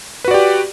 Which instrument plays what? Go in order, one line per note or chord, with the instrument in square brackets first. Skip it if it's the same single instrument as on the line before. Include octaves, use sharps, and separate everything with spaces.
[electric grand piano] B4
F#4
D5
G4